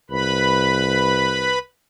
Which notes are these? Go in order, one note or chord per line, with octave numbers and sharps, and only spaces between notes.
C2 B4 B5